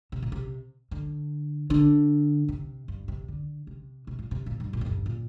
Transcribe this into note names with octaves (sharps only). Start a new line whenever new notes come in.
C3
A#2
C3
D3
D3
C3
G2
C3
D3
C3
C3
A#2
C3
A#2
G2
A#2
F2
G2
A#2